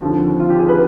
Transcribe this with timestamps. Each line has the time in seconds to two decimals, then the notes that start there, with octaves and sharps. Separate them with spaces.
0.01 D#2 D3 F3 C4
0.40 F4
0.50 G4
0.59 G#4
0.69 B4